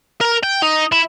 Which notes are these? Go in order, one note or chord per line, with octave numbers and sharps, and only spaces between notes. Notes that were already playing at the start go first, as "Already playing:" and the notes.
A#4
G5
D#4
E4